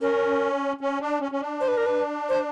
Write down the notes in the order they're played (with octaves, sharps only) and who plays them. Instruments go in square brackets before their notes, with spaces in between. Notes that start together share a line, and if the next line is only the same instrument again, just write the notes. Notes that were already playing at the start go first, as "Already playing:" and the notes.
[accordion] C#4 [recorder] A#4
[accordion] C#4
D4
C#4
C#4
D4
[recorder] C5
B4
A#4
B4
C5